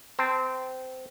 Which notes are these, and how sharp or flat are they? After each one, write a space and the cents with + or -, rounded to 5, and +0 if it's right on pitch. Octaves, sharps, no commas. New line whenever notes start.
C4 -20 A5 +0